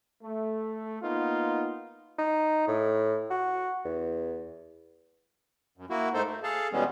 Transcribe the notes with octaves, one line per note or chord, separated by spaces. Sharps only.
A3
A#3 B3 D#4 F4
D#4
A2
F#4
E2
F#2
A#3 E4 F#4
G#2 A3 D#4 A4 C5
A3
G#4 A4 F5 A5
B2 E3 G3 G#3 B3 C#4